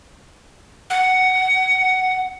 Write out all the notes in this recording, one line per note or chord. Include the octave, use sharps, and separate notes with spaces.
F#5